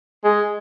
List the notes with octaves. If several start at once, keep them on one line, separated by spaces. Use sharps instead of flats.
G#3